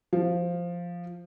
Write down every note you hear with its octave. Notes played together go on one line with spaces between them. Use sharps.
F3